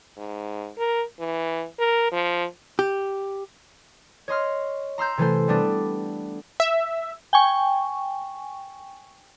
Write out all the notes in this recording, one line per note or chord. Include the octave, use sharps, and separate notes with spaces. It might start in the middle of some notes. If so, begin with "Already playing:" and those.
G#2
A#4
E3
A#4
F3
G4
C#5 D#5 C6 F6
A#5 C6 E6 G6
C3 E3 A3 C5
G3 B3 D4
E5
G5 G#5 C#6